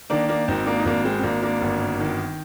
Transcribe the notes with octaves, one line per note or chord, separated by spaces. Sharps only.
D#3 A#3 D4
A#3 D4
G#1 C4 D#4
A#3 D4
D#4
G#1 A#3 D4
G#3 C4
C4
G#1 A#3 D4
A#3 D4
G1
D#3